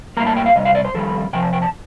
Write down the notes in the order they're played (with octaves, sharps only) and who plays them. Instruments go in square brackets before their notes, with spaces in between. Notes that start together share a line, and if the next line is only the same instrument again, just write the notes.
[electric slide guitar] A2 G3 A#3 A#5
A5
G5
F5
C3 G3 D#5
F5
D5
C5
F2 D#3 G3 A4
C3 F3 G5
A5
G5
A5